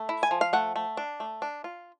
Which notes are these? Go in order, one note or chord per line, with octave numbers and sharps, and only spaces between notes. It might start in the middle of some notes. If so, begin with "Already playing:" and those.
Already playing: A3
E4
G#5
F3
F5
A3 F#5
A3
D4
A3
D4
F4